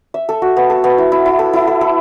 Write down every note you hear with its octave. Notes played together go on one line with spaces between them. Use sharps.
E5
A4
F#4
B3
A4
B3
E4
E4
E4
A4
E4
A4
A4